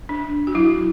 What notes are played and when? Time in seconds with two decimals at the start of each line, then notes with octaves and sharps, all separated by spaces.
0.09 D4
0.47 F#4
0.55 F#3 E4